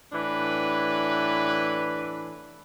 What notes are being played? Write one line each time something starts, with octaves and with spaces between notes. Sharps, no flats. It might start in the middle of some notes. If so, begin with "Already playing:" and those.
A2 E3 D4 B4